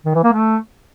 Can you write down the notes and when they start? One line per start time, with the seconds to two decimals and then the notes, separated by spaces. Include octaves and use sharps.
0.06 D#3
0.15 E3
0.24 A#3
0.33 A3